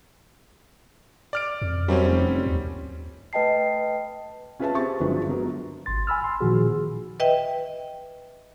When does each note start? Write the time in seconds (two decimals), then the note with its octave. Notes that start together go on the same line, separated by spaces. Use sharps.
1.33 D5 F6 D7
1.62 F2
1.88 F#2 G3 C4 C#4
2.08 F1
2.46 D#2
3.33 A3 B4 D#5 G5 A5 C7
4.59 C#4 F4 G#4 B4 E5 A5
4.74 C4 G4 E5 C#6 A6
5.00 G1 F3 F#3 G#3 D4 B4
5.28 F#3 B3 A#4
5.86 G#1 C6 A6
6.07 G#5 B5 E6 F6
6.24 C6
6.41 A#2 D#3 F3 F#4 G#4
7.20 B4 D#5 E5 G5